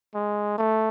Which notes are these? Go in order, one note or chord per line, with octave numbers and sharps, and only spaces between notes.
G#3
A3